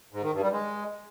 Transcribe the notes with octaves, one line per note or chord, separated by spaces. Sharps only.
G#2
D#3
G2
G3
G#3